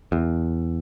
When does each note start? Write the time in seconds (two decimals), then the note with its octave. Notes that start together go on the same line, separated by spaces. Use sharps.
0.12 E2